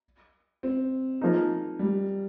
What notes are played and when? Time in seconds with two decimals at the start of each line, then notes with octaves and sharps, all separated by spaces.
0.63 C4
1.21 F3 A#3 D#4 G#4
1.79 G3